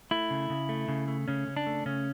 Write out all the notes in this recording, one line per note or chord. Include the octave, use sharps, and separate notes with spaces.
A3 E4
C#3
C#3
A3
C#3
A3
C#3 C#4
C#3
D4
A3
C#3 C#4